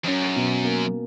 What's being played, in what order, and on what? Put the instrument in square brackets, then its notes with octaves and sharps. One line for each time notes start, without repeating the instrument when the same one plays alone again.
[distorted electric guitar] F2
[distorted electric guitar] F#2 [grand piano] C#4
[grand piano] B2
A#3